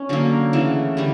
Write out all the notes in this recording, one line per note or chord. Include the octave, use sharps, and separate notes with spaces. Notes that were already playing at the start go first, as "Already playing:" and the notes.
Already playing: C#4
D3 F#3 A#3
C#3 E3 A3
D3 G3